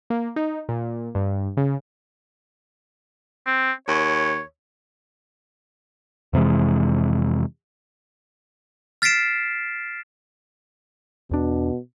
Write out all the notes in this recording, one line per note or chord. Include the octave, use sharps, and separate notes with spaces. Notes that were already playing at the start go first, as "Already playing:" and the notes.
A#3
D#4
A#2
G2
C#3
C4
D#2 C#5
F2 C3 E3 G#3
F6 A6 B6 C7 D7 E7
E2 B2 D4